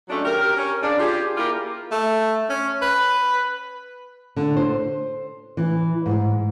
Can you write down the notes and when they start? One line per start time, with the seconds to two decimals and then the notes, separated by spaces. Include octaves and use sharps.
0.09 C#3 F#3 G#3 A3 C#4 D4
0.24 G4 A#4
0.56 C#4
0.82 C#3 D4
0.99 F4 G4 G#4
1.37 A#3 E4 F4 G4 A#4
1.91 A3
2.49 C#4
2.82 B4
4.36 D3
4.57 C5
5.57 E3
6.06 G#2